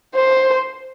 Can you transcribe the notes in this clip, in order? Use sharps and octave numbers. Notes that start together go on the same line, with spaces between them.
C5